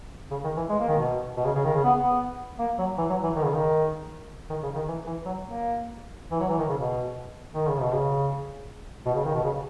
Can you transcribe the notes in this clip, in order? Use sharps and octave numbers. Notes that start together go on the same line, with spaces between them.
C#3
D#3
E3
G#3
A#3
D#3
B2
B2
C#3
C#3
D#3
C#3
B3
B3
A#3
F#3
E3
F#3
E3
D#3
C#3
D#3
D#3
C#3
D#3
E3
E3
F#3
A#3
E3
F#3
E3
D#3
C#3
B2
D#3
C#3
B2
C#3
B2
C#3
D#3
B2
C#3